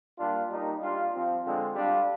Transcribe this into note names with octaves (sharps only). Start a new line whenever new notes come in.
A#2 G3 D4 F4
G3 A#3 D#4
G3 D4 F4
F3 C4 F4
D3 G#3 C4 F4
G3 D4 F4